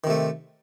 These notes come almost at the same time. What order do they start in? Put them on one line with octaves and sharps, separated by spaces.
D#3 C3 A3